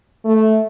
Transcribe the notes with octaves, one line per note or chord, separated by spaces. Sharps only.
A3